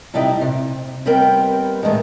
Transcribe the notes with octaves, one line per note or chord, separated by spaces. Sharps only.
C3 G3 D#4 E4 D#5 G5
C3
D#2 G3 B3 C4 A#4 G5
D2 A2 D#3 E3 G#3